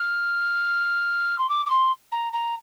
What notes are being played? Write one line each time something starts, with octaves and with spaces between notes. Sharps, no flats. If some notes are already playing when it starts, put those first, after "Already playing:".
Already playing: F6
C6
D6
D6
C6
A#5
A#5